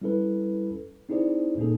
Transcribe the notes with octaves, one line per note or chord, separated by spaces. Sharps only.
G3 C#4 E4 A4 B4
C4 D#4 E4 G#4 C5 D5
A#2 A#3 C#4 D#4 G#4 A4